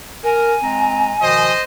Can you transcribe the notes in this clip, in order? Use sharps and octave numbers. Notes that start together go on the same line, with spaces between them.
A#4 G#5
G#3 C4 A#5
B2 D#3 F3 C5 D#5